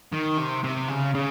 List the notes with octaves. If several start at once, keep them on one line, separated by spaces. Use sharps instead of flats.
D#3
C3
C3
C#3
C#3